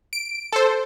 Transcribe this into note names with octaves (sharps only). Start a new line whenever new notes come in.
D7
A4 C5